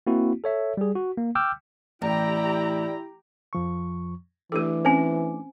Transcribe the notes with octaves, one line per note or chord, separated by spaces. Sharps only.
A#3 C4 E4 F#4
A4 C#5 E5
G3 G#4
F#4
A#3
G5 D6 E6 F6 G6
A1 E4 G4 D5 G5 A#5
F2 F3 C#6
E3 A3 D4 G4 A4 D6
C4 C#4 C5 G#5